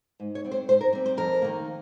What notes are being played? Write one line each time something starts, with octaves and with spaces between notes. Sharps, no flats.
G#2
C#5
G3 C4
C5
G#2 C5
A#4
G3 C4
C5
F2 A#4
D#3 A#3